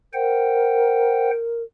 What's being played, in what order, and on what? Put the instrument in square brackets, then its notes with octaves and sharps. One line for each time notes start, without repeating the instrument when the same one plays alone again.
[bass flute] A#4 [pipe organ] C5 F#5 G5